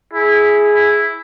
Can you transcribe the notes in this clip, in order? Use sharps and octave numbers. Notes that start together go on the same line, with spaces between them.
E4 G#4
E4